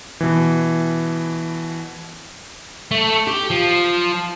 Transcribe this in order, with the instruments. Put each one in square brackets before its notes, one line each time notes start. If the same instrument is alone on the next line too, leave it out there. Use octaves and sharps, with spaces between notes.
[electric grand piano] B2 E3
[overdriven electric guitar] A3
G4
F3